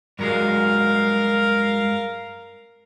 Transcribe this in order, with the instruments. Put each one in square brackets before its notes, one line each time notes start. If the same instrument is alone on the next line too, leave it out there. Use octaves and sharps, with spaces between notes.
[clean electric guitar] G2 F#3 G#3 [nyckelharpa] A#4 F5